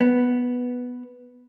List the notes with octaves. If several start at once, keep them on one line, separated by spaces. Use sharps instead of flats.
B3